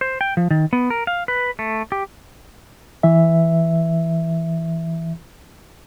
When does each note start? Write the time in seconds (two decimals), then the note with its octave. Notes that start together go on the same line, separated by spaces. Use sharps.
0.01 C5
0.21 G5
0.37 F3
0.51 D#3
0.73 B3
0.90 A#4
1.07 F5
1.28 B4
1.59 A3
1.92 G4
3.03 E3 E5